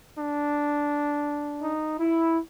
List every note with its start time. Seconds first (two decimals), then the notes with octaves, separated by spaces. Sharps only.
0.16 D4
1.63 D#4
2.00 E4